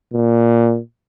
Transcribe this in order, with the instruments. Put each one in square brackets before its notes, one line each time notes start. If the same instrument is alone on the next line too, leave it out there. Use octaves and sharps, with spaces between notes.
[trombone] A#2